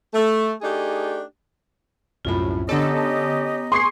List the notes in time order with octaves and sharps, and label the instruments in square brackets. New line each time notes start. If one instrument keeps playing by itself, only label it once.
[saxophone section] A3
A3 D4 D#4 G4 G#4
[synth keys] C2 F#2 A2 [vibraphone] F4 B5
[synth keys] D3 A4 [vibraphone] B3 A#5 [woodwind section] C#4 G4 D#5
[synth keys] G#4 [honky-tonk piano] C6 C#6 C7